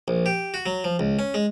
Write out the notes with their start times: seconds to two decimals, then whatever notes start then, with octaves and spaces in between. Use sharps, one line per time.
0.08 A#1
0.26 G4
0.54 F#4
0.66 F#3
0.84 F3
0.99 C#2
1.19 C#4
1.34 G#3